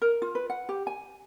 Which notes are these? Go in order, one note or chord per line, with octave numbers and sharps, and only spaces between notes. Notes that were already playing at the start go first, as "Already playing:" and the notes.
A#4
F4
B4
F#5
G4
G#5